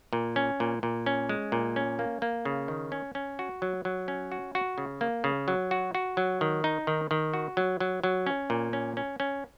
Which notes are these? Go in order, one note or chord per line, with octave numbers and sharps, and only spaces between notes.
A#2
C#4
A#2
A#2
C#4
G#3
A#2
C#4
A#3
A#3
C#3
D#3
C#4
C#4
F#4
F#3
F#3
C#4
F#4
F#4
C#3
A#3
C#3
F#3
F#4
F#4
F#3
D#3
D#4
D#3
D#3
F#4
F#3
F#3
F#3
C#4
A#2
C#4
C#4
C#4